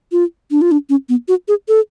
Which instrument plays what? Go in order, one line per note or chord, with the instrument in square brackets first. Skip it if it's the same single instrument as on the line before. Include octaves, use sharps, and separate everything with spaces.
[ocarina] F4
D4
F4
D4
C#4
B3
F#4
G#4
A4